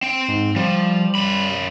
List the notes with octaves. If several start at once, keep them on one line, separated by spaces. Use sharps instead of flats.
C4 G5
G#2
F3 G3
F#2 B5